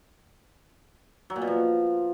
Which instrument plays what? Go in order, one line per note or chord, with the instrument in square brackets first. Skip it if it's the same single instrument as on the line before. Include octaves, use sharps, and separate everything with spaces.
[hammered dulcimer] F#3
A#2
B2
F3